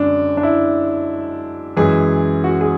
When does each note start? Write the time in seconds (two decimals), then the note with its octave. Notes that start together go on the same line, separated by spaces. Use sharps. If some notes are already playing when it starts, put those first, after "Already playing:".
Already playing: F#2 D3 G#3 D4
0.37 D4
0.43 E4
1.77 F#2 E3 G#3 G#4
2.44 F#4
2.61 G#4